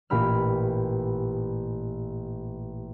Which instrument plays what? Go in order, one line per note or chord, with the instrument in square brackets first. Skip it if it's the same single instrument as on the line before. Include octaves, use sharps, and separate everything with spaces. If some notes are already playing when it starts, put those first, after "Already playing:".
[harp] A1 A#2 G4 B5 F6